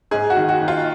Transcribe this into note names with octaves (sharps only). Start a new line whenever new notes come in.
G#2 G#4
F#4
D#3
F#4
D#3
F4